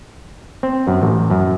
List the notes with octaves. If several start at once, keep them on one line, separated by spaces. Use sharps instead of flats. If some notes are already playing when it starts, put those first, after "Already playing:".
C4
F#2
A1
F#2